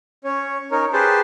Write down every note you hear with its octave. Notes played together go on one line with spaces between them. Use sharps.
C#4 C#5
C#4 D#4 A#4 C#5
G4 G#4 B4 C5 A5 C6